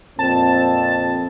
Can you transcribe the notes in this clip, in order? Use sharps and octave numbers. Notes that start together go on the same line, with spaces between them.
F2 A#2 C4 A5